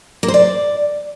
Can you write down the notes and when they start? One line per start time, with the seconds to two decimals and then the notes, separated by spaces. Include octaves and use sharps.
0.23 A#3
0.28 C5
0.34 D5